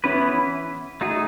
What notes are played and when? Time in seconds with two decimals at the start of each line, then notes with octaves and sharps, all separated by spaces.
0.04 E3 B3 C#4 E4 B4
1.01 A3 D#4 F#4 G#4